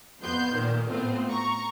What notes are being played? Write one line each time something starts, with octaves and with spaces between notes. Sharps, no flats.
F2 B3 C6 G6
A#2 D#3
A2 A3 B3 C4 F4
A#5 C#6